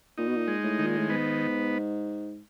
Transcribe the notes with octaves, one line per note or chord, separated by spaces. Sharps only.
A#2 D#4
B2
A#2
G#3
A2
D#3
A#2
A2
G#2 B3